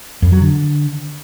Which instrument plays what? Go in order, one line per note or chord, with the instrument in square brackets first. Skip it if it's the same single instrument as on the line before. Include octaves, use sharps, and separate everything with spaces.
[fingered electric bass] F2
F#3
D3